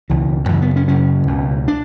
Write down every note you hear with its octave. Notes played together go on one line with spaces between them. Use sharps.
C#2 B2 E3
F#2 C#3 E3
B3
C#4
F#2 C#3 C#4
C#2 B2
D4